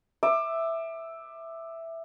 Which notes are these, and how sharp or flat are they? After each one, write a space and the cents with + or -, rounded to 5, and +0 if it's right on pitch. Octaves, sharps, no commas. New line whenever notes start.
E5 +0 D6 +25